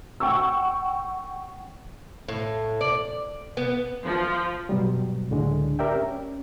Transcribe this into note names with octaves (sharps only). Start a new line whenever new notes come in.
F#5 G5 C#6 E6
A2
D5
B3
F3
G2 B2 F#3 G3
C#2 A2 D3 G#3 D4
G4 A#4 D5 E5 G5
C#4